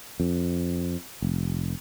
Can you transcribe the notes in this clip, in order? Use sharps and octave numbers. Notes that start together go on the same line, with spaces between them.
F2
F1